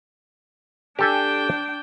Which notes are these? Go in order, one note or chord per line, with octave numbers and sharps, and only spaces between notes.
D4 G4 A4 G5 G#5